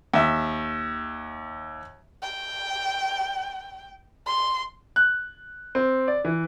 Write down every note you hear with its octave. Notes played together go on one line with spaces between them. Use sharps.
D#2 E5
G5
C6
F#6
C4
D5
E3